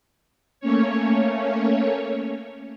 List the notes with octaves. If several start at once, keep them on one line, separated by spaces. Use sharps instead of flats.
A3 A#3 C#4 C#5